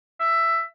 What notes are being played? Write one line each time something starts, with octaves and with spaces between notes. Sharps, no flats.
E5